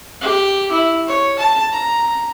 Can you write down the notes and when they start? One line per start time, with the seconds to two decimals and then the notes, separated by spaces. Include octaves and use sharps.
0.21 G4
0.72 E4
1.07 C#5
1.39 A5
1.72 A#5